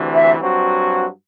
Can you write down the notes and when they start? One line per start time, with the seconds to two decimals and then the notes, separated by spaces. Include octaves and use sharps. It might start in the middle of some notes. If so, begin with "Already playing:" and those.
Already playing: D2 C3 E3
0.14 E5
0.37 G2 F#3 C4 F#4